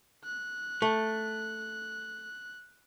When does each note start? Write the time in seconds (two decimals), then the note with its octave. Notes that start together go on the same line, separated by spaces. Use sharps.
0.24 F#6
0.82 A3